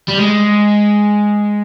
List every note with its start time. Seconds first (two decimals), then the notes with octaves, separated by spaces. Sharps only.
0.08 G3
0.18 G#3